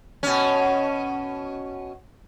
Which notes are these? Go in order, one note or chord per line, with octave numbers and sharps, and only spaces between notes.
B2 C#4